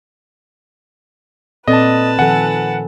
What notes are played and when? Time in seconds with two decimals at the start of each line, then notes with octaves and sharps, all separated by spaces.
1.68 A#2 C4 A4 B4 D5 D#5 A5
2.19 D#3 F3 A4 F#5 G#5